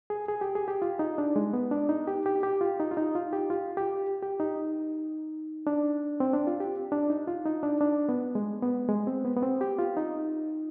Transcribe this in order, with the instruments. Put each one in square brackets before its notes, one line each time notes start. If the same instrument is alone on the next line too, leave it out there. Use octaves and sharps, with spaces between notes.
[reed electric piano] G#4
G#4
G4
G#4
G4
F4
D#4
D4
G#3
B3
D4
D#4
G4
G4
G4
F4
D#4
F4
D#4
F4
G4
F4
G4
G4
D#4
D4
C4
D4
F4
G4
D4
D#4
F4
D#4
D4
D4
B3
G#3
B3
G#3
C4
B3
B3
C4
G4
F4
D#4